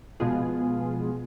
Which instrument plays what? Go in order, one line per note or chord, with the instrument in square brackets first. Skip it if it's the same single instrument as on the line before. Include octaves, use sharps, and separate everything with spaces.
[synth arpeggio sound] B2 F3 G#3 B3 F4 G#4